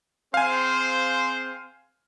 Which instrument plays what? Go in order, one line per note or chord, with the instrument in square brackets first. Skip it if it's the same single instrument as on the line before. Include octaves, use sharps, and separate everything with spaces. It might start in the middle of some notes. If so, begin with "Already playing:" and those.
[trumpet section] C4 G#4 C5 [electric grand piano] F5 G#5